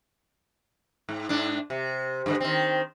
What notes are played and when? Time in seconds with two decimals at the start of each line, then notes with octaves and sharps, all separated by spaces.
1.09 G#2
1.29 G#2 D4
1.70 C3
2.26 G2 D3 G#3
2.41 D#3 C4